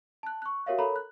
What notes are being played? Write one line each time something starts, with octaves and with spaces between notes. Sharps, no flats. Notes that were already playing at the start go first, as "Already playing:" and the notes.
A5 F#6
C#6 F#6
F#4 G4 A#4 C#5 E5 F5
A4 A#4 C#5 A#5 B5
F#6